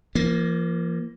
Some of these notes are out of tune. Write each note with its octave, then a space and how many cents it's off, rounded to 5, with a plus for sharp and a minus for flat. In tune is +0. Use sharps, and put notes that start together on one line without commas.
F3 -40 A#3 +0